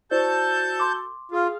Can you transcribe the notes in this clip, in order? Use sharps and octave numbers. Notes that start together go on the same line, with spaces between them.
E4 F#4 A4 C5 D5 A5 G6
C6 D6
F4 G#4 F5